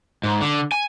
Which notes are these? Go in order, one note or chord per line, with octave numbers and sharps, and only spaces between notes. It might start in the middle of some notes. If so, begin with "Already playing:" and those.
G#2
D3
G#5